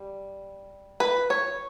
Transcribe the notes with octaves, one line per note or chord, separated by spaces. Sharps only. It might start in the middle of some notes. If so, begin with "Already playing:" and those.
Already playing: G3
B4
C#5